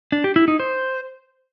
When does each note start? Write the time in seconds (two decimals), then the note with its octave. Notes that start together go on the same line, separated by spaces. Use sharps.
0.12 D4
0.24 G4
0.36 E4
0.48 D#4
0.60 C5